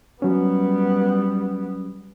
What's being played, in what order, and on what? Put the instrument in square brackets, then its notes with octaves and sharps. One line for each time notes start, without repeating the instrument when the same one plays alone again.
[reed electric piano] F#3 C#4 [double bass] G3 B3